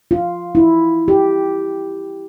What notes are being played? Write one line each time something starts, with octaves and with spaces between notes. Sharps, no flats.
F4
E4
G4